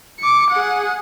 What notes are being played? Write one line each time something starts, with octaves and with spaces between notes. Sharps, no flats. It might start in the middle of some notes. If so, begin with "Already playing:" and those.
D6 C#7
G#4 F#5